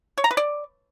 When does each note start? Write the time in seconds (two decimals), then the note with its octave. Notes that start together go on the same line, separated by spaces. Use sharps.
0.18 C#5
0.24 A#5
0.31 B4
0.37 D5